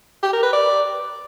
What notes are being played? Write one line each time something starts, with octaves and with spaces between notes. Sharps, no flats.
G4
A#4
B4
D5